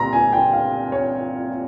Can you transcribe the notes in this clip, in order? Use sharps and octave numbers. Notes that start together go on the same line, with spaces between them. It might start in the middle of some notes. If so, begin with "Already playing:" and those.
Already playing: C2 A#2 A#5 C6
G#5
G5
F5
C#5